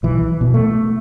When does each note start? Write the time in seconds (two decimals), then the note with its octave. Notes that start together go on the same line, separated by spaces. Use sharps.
0.03 B1 E3
0.41 B2
0.54 A3